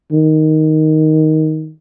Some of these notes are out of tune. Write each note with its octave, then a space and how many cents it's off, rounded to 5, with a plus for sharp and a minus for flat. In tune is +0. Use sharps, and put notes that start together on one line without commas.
D#3 +5